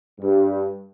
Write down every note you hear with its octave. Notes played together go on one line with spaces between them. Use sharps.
G2